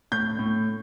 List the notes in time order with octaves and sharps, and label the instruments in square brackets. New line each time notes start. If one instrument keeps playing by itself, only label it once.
[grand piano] A2 G6
A2